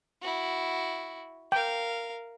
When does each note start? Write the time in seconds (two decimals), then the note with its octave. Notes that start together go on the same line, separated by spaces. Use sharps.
0.21 E4 F#4
1.52 A#4 F5 G5